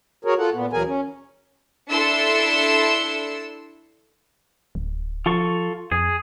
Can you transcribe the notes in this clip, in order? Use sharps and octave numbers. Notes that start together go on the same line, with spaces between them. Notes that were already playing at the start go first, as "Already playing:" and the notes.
F#4 G#4 A#4 C#5
F4 A4 F#5
A#2 B3
D2 E3 F#3 G#4 A#4 G#5
C#4
D4 E4 A4 C6 E6 C#7
D1
F3 F4 A4 C#6
F2 G#4